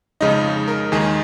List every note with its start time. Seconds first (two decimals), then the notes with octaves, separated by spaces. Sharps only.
0.21 F2 C#3 G#3 D#4 D#5
0.68 A#4
0.92 D#2 D#3 G#3 D#4 G#4